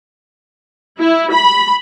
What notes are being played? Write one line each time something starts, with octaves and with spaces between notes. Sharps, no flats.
E4
B5